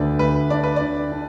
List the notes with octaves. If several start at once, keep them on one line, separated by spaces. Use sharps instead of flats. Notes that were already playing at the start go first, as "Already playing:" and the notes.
Already playing: D2 D3 B4 D5
D2 B4
D4 D5
B4
D3 D5
D4